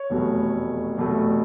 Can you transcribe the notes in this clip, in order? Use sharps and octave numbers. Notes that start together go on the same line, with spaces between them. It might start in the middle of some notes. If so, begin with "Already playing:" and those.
Already playing: C#5
F1 E2 B2 F#3 A3
F1 E2 B2 F#3 A3